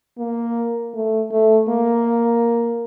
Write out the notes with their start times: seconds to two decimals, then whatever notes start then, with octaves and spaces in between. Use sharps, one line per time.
0.18 A#3
0.94 A3
1.32 A3
1.69 A#3